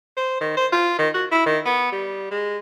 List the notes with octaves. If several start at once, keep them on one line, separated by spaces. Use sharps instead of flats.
C5
D#3
C5
F4
D#3
F#4
E4
D#3
B3
G3
G#3